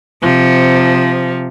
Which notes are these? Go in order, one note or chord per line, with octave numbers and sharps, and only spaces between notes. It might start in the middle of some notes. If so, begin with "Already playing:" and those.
C3 F3